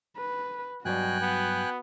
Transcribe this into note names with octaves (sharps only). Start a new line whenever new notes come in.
B4
G2 B2 F#3 F#4 D5 G5 G#5 F#6
B3